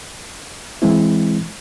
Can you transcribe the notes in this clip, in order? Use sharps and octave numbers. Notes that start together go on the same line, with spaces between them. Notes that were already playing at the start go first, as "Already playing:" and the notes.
E3 G#3 C4 E4